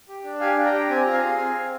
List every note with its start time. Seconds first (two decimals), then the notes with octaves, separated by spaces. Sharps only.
0.09 G4
0.24 D4
0.40 G4 F5 G#5
0.57 D4
0.65 G5 A#5
0.73 G4
0.89 C4 G#5
1.01 F4 A#5
1.13 F5 G#5
1.23 G#4
1.38 C4
1.55 C4